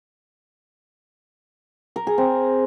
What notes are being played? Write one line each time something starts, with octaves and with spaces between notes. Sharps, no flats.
A#4
G#4
C4